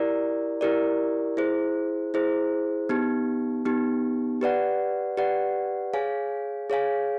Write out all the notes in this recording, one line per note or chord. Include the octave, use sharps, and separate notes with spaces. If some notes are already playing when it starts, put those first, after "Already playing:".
Already playing: E4 G4 A#4 D5
E4 G4 A#4 D5
E4 G#4 C5
E4 G#4 C5
B3 D#4 G4
B3 D#4 G4
G4 B4 D5 F#5
G4 B4 D5 F#5
G#4 C#5 F5 G#5
G#4 C#5 F5 G#5